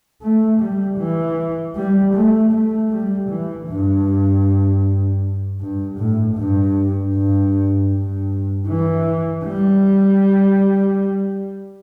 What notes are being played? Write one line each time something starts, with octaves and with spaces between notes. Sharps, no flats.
A3
G3
E3
G3
A3
A3
G3
E3
G2
G2
A2
G2
G2
G2
E3
G3